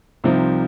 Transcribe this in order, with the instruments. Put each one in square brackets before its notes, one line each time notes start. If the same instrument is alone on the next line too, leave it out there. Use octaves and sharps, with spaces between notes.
[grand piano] C2 C3 F3 C4 D#4